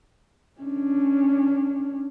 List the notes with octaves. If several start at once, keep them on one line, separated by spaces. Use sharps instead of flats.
C#4 D4